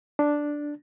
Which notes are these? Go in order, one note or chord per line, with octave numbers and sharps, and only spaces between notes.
D4